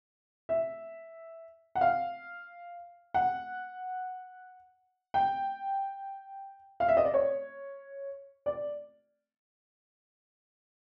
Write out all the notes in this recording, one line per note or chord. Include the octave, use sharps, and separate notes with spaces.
E5
F#5
F5
F#5
G5
F5
E5
D#5
D5
C#5
D5